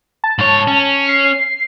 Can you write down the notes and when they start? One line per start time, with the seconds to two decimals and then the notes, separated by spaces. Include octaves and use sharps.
0.24 A5
0.39 G#2 C#5
0.67 C#4
1.09 C7